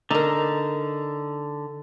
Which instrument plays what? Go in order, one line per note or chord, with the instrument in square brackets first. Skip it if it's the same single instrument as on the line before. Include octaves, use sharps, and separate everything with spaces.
[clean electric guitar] D3 [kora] D#4 A#4